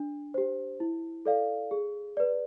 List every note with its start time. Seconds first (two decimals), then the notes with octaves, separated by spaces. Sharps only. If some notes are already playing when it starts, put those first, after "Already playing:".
Already playing: D4
0.34 G4 C5
0.80 E4
1.26 A4 D5 F5
1.71 G#4
2.17 B4 D5